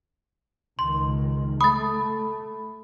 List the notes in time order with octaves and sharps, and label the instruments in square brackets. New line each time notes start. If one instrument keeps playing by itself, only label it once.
[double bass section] C#2 D#3 [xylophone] C6
[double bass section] A3 [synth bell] B5 [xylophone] D#6 A6